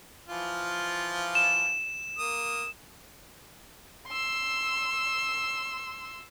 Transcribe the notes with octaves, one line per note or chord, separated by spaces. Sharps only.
E3 F3 F4
E7
A#3 D#6
C6 E6